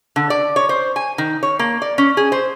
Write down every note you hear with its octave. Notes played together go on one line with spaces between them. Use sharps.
D3
D5
C#5
C5
G#5
D#3
C#5
A#3
D5
C#4
G#4
C5